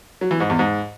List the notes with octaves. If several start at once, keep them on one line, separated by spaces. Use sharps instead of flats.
F#3
E3
G#2
E2
G#2